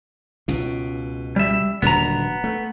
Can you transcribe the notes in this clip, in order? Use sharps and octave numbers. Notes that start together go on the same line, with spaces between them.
C#2 B2
G3 E5
D#1 D3 F#3 B3 A#5
A3